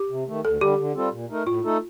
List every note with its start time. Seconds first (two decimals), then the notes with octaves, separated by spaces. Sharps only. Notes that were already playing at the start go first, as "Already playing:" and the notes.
Already playing: G4
0.10 C3
0.27 D#3 A3
0.44 D2 A4
0.61 D3 G3 G4
0.79 D3
0.95 G3 C4 F4 A4
1.12 A#2
1.30 A3 D#4 A#4
1.46 A2 F4
1.64 A3 D#4 A4